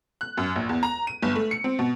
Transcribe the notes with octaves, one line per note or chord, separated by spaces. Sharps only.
F#6
F#2
A#1
E2
A#5
D#7
G1
A3
C#7
C4
B2